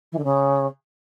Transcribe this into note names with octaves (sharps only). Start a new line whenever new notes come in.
E3
D3
C#3